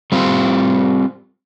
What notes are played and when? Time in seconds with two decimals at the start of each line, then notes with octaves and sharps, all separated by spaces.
0.12 G3 C4 F4